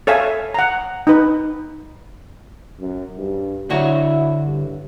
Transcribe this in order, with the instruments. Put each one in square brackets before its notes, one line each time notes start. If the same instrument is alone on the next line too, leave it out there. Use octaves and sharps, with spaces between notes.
[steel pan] A4 C#5 E5 F5 G#5
F#5 A#5
D#4 B4
[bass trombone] F#2
G2
[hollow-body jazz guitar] D3 F#4 C#5 [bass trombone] E4
[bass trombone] G2